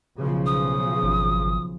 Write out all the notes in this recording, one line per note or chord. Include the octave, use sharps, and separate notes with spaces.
B1 C#3 F3
D#6
G#1